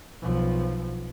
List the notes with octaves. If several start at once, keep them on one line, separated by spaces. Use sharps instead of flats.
B1 F3